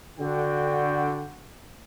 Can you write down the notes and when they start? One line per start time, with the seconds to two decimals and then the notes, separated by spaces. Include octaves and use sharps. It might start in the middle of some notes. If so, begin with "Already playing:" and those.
0.19 D3 F#4 G5